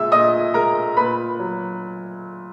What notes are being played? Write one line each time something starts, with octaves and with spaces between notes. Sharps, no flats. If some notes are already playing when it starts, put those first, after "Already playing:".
Already playing: A#2 G#3 E5 E6
A#2 D#5 D#6
G#3 A#4 A#5
A#2 B4 B5
F#3